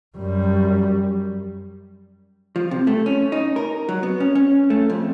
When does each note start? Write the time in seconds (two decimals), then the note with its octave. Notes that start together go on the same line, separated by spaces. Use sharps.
0.17 F#2 G3
2.56 F3
2.71 C3
2.87 A3
3.06 C#4
3.32 D#4
3.56 A#4
3.89 F#3
4.03 B3
4.20 C#4
4.35 C#4
4.70 A3
4.90 F2